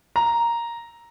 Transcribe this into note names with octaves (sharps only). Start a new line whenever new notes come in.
A#5